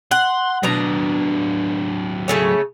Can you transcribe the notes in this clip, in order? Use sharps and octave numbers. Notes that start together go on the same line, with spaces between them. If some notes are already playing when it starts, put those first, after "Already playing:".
F#5 C6
B2 F#3 D4 A#5
C#3 A3 C#4